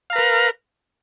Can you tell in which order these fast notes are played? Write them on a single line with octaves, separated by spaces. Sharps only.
F5 A#5 B4 A#4